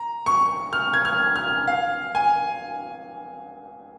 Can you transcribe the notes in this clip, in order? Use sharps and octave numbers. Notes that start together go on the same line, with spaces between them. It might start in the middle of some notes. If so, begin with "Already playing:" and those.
Already playing: A#5
C#6
F6
G#6
F6
F6
F5
G#5